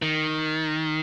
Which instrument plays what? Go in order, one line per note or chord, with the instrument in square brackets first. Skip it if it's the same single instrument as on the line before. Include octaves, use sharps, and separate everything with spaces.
[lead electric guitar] D#3